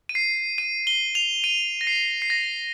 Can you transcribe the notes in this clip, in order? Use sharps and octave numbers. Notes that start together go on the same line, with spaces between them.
D#7
C7
D#7
G7
F7
D#7
A#6
C7
C7
A#6